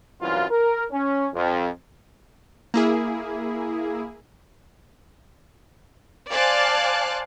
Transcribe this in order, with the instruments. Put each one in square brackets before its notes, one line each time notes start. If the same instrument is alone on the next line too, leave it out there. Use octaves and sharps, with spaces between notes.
[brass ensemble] C2 F#2 E3 F#3 F4
A#4
C#4
F2
[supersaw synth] A#3 E4 G#4
[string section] C5 D5 F5 G#5 A5 F#6